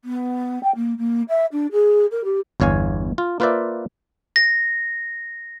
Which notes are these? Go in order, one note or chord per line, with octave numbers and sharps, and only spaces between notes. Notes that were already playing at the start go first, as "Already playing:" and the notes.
B3
G5
A#3
A#3
E5
D4
G#4
A#4
G4
G1 E2 C#5 F5 G#5
F4
A#3 F4 B4 C5 D5 E5
A#6